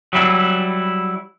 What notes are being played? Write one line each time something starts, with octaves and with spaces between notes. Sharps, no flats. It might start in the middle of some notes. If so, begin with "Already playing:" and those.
F#3 G3 E4